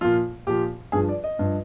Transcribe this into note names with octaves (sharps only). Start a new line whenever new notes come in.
A#2 F3 F4
A#2 F3 G4
G2 F3 G#4
D5
D#5
G2 F3